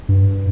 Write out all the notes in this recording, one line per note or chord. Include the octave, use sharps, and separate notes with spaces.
G2